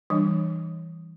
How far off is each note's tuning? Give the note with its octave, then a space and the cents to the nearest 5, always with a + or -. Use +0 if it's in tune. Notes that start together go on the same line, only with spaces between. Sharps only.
E3 +0 G3 +0 D4 +30